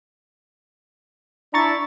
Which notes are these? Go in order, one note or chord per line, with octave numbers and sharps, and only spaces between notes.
D4 E4 A#5 C#6 A6